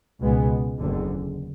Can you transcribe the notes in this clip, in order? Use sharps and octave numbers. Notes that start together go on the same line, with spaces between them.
C#2 B2 G#3 B3
F#1 E2 D3